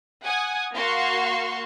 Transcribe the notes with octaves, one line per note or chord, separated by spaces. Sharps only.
F#5 G#5 D#6
A#3 F#4 F5 C6 C#6